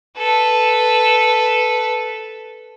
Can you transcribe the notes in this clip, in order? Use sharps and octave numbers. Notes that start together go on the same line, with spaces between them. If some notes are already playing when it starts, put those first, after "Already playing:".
A4 B4